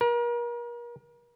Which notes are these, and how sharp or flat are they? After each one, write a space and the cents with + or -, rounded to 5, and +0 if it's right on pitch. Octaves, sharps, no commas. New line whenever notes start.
A#4 +35